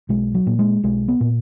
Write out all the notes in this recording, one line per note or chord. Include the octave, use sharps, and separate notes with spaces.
B1 G#3
F#3
A#2
G#3
B1 G#3
B3
A#2